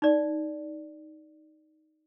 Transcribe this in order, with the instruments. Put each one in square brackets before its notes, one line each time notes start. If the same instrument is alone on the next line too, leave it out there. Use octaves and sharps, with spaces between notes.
[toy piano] D#4 D5